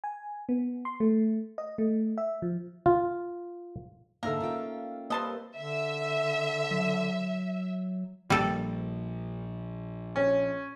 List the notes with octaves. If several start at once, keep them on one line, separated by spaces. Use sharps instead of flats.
G#5
B3
C6
A3
D#5
A3
E5
F3
F4
G#2 D3 A#3 D#4 A4 A#4 E5 F5
C#4 F4 G5
G3 A#3 C4 B4 D#5 A5 C6
D3 E5
F#3
A#1 G3 A#3 A4
C#4